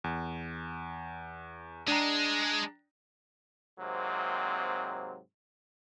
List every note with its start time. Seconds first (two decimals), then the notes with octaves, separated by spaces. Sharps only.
0.04 E2
1.88 G#3 D4 G5 A#5
3.79 G#2 C3 F#3 A#3 C4